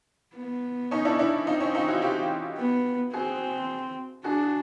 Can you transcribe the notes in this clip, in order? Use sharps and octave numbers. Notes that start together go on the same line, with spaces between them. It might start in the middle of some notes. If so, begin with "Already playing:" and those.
B3
C#4 D#4
D4 E4
D4 E4
C4 D#4 F4
C#4 D#4
D#4 F4
E4 F#4
F4 G4
B3
C4 F#4 G#4
D4 F#4 G#4